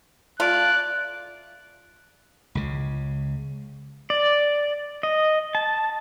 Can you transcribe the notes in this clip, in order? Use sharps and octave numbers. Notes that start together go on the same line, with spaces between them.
A3 F4 D5 F#6
C#2 C#3
D5
D#5
A5